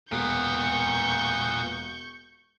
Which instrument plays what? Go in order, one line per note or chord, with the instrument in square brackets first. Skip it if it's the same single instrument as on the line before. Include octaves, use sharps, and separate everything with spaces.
[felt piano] E1 [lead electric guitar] A#2 B3 [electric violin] C#6 G6